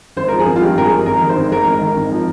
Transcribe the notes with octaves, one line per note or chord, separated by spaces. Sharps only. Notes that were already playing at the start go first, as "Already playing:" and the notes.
G#1 C5
F3 A#4
G#4
G#1
F4
G2 G4
G#1 A#4
G#4
F3
G#1 A#4
D#3
C5
G#1
G#2 A#4
G#1
A#4
D#3
G#1
F3